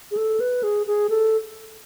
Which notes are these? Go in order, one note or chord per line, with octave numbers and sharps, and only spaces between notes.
G#4
A4
B4
G#4
G#4
A4